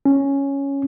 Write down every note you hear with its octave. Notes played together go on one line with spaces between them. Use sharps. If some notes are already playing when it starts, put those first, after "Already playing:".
C#4